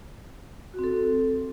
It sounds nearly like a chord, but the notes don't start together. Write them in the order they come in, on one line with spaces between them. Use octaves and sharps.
F#4 C4 A4